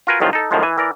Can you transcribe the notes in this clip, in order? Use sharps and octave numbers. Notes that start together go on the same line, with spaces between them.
F4 F#4 A#4 B4 G#5
C2 G#2 D#3 F3 F#3 F4
D#4 A4
F#2 A2 D#3 F3 G#3
E3 G#5
E3 A#4 D5